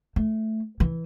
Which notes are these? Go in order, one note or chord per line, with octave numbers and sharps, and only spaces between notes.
A3
E3